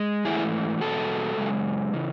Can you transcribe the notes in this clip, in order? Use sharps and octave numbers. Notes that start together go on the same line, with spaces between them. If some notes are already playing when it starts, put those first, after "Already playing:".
Already playing: G#3
G#2 E3 A3 E4 G#4
E2 B2 G#3 F#4 A4
F#2 C#3 G#3
C#3 E3